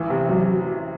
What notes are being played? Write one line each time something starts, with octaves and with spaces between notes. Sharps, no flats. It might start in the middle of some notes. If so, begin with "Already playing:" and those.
Already playing: A1 E3
C3
F#3